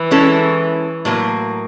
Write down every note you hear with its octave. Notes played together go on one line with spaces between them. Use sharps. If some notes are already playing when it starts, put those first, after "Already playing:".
Already playing: E3
G#3 C#4 E4 A4
A2 F#3 A#3